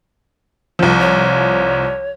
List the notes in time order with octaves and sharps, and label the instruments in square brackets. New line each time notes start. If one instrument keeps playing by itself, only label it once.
[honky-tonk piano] C2 F3
[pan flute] C#5